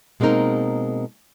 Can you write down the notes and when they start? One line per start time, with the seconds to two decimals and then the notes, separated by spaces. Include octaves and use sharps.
0.20 B2 G#3 A#3 C4 D#4 A#4